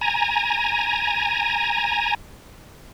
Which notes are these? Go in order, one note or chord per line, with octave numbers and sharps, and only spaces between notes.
G#5 A#5